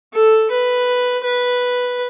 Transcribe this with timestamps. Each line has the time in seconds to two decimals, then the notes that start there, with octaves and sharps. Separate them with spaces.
0.14 A4
0.51 B4
1.24 B4